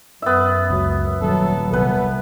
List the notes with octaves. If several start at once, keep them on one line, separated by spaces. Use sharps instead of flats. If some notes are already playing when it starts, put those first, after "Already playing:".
F#2 B3 E5
C#2 F#3
D#1 F#3 A4
C2 B3 B4